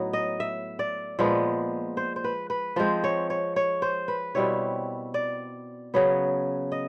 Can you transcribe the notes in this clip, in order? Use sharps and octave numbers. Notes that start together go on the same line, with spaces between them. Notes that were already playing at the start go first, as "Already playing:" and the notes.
Already playing: A2 F#3 B3 D#4
D#5
E5
D5
A#2 F3 G#3 B3
C5
C5
B4
B4
F3 G#3 C4 C5
C#5
C#5
C#5
C5
B4
B2 G3 C4 E4 C#5
D5
C#3 F#3 B3
D#5